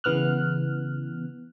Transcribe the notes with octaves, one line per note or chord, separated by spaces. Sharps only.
C#3 E3 B3 F6 F#6